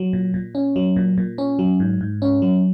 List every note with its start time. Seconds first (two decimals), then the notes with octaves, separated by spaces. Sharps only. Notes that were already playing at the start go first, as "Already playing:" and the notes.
Already playing: F#3
0.13 A#2
0.34 A#2
0.55 C#4
0.76 F#3
0.96 A#2
1.18 A#2
1.38 C#4
1.59 F#3
1.80 G#2
2.01 G#2
2.22 C#4
2.42 F#3